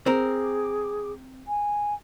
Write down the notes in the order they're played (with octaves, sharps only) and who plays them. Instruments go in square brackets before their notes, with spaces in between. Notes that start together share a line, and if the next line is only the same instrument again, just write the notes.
[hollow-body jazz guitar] C4 A#4 [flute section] G#4 D6
[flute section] G#5